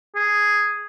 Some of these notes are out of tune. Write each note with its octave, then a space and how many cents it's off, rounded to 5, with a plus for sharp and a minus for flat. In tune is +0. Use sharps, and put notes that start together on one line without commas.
G#4 +0